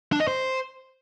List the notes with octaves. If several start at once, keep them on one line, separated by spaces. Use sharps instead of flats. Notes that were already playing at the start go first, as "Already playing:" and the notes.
D4
D#5
C5